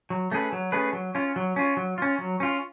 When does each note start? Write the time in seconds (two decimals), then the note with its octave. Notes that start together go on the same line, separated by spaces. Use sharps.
0.10 F#3
0.32 A3 C#4 G#4 B4
0.53 F#3
0.72 A3 C#4 G#4 B4
0.93 F#3
1.15 C#4 F4
1.36 F#3
1.56 C#4 F4
1.77 F#3
1.98 C#4 F4
2.19 F#3
2.40 C#4 F4